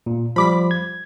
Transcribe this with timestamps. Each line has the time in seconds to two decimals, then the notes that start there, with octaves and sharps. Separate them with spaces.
0.06 A#2
0.36 F3 G3 B5 D6 B6
0.71 G#6